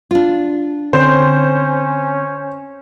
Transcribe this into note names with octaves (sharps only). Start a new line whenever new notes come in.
D4 F4
D3 C4 C#4 C5